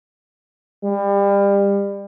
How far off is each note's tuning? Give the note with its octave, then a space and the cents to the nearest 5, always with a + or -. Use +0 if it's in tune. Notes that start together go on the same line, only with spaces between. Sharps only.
G3 +30